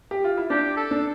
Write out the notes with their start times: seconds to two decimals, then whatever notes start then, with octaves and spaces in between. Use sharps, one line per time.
0.11 G4
0.24 F4
0.37 E4
0.50 D4 G4
0.77 A4
0.91 D4